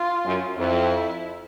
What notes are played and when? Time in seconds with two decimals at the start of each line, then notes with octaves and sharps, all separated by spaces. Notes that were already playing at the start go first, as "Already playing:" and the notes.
Already playing: F4
0.25 F#2
0.57 F2 E4